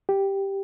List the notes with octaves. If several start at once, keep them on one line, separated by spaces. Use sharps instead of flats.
G4